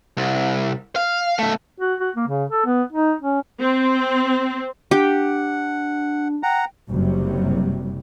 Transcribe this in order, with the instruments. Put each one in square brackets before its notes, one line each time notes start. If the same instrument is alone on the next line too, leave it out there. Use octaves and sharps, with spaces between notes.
[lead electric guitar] C2
F5
B1 A3
[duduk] F#4
F#4
A#3
C#3
A4
B3
D#4
C#4
[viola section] C4
[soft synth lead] D4 [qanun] G4 [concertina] F#5
[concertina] F#5 A#5 [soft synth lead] G5
[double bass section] F#1 C3 F#3 G3